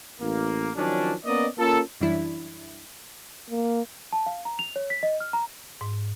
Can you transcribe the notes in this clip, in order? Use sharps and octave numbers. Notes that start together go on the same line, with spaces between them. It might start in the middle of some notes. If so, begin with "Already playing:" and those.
A1 A#3
D#3 F3 F#3 C#4 D4
A#3 B3 C#4 D5 D#5
A#3 C#4 F4 A4
F#2 E3 G3 D4 E4
A#3
A5
F5
A#5
F7
C#5
B6
D#5
F6
A#5
G#2